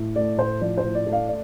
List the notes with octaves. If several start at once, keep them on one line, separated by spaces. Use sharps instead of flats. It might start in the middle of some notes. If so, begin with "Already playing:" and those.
Already playing: A2
A3 D5
A2 C5
F3 D5
C5
A2
D5
A3
D5 F5
D5